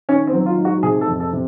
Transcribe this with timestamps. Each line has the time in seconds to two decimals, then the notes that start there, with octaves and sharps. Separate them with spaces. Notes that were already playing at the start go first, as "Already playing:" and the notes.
0.09 D#3 C#4
0.27 C4
0.33 F#3
0.46 F4
0.58 G#2
0.65 F#4
0.83 C3 G#4
1.01 A4
1.07 F2
1.20 A4
1.33 C3